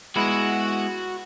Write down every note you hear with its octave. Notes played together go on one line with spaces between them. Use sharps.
G#3 B3 E4 F#4